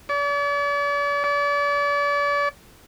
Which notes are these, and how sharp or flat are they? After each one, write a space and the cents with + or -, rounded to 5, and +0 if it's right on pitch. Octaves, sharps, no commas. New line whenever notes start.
D5 -45
D5 -40